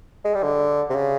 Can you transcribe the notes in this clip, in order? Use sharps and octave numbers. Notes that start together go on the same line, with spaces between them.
G#3
G3
D3
C3
C#3